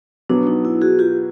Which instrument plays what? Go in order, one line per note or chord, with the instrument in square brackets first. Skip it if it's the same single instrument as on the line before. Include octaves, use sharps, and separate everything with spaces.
[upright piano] B2 F#3 B3 [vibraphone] D4
[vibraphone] D#4
E4
F#4 G#4
F4 G4